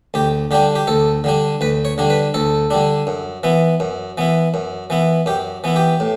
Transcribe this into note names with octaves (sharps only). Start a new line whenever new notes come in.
D2 G4
D3 G3 D4 G4
G4
D2 A4
D3 G3 D4
D2 B4
C#5
D3 G3 D4
B4
D2 A4
D3 G3 D4
F#2
E3 B3 E4
F#2
E3 B3 E4
F#2
E3 B3 E4
F#2 G4
E3 B3 E4
G4
A2